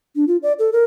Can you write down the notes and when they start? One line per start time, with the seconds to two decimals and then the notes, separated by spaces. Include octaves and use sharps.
0.16 D4
0.28 F4
0.43 D5
0.59 A4
0.73 A#4